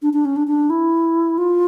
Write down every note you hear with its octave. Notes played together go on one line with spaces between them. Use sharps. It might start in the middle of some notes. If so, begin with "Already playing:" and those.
D4
D4
C#4
D4
D4
E4
F4